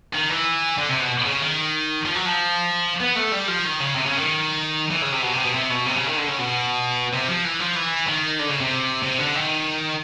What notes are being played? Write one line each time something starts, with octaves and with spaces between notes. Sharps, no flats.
D#3
E3
D3
C3
B2
C#3
D#3
F3
F#3
F3
B3
A3
G3
F3
D#3
C#3
C3
C#3
D#3
E3
C#3
C3
B2
C3
B2
C3
B2
C3
C#3
D#3
D3
C#3
B2
C3
F3
E3
F3
E3
D#3
D3
C#3
C3
C3
D3
D#3